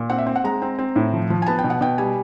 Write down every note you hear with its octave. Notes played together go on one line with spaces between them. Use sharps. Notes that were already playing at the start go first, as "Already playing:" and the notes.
Already playing: A#2
C4 F#5
E5
C4
F#5
G#3 A#5
C4
C4
A2
F3
F3
G#5
B3 A5
G5
B2
F#5
B2 G5
G3 G#5